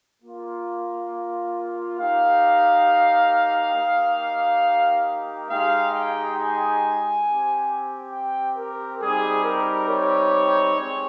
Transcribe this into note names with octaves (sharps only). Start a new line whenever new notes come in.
A#3 F4
A#3 D#4 G4 F5
A#3 D#4 G4
G#3 D#4 G4 F5
G5
G#5
C4 G4
G5
A#4
G3 C4 D#4 G4 G#4
A#4
C#5
G#3 C4 G4